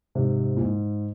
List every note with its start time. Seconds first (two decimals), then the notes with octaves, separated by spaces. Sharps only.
0.15 G#2 C3
0.57 A#2
0.61 G#2